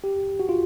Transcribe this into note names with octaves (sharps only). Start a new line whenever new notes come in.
G4
F#4
F4